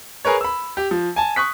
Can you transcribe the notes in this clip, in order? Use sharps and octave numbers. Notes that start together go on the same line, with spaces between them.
G#4 A#4 B4 C#5
B5 E6
G4
F3
G#5 A5
C#6 D#6 F#6 B6